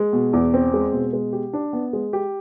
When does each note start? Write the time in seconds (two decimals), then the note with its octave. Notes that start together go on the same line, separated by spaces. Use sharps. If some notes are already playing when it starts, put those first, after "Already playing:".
Already playing: G#3
0.13 B2
0.33 E2
0.54 C4
0.74 G#3
0.92 B2
1.13 G#3
1.33 G4
1.53 D4
1.73 B3
1.93 G#3
2.13 G4